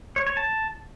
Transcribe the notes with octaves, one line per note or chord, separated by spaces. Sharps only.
C#5
C#5
A5